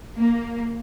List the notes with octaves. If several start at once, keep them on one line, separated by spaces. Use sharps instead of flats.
A#3